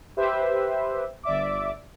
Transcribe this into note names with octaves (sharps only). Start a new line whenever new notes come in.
G4 B4 C5 E5
G1 D5 E5 D6